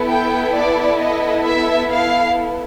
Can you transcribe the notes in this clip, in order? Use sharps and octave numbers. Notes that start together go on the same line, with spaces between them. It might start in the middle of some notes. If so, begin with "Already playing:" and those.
Already playing: B3 E4 A4
G5
D5
D#5
E5
F5